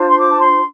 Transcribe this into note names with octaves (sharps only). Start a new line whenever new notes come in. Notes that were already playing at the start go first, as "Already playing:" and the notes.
Already playing: D4 F4 C5
C6
D6
A5
C6